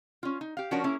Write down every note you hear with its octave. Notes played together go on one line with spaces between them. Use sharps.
C#4 F4
D#4
G4 F5
F3 C#4 D4 F#4 A#4 C#5
A#3 C#4 E4 G#4